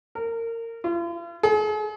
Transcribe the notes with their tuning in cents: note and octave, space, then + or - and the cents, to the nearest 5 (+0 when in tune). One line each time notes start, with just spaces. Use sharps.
A#4 -25
F4 -45
G#4 +40